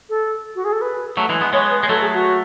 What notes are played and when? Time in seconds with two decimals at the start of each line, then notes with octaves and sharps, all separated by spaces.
0.09 A4
0.55 F#4
0.65 G#4
0.72 A4
0.81 B4
1.17 F#3 A3
1.29 E3 G#3
1.41 G#3 B3
1.53 G#3 B3 C#5
1.71 B4
1.83 G#3
1.89 F#3 A3 A4
2.01 G#4
2.13 F#4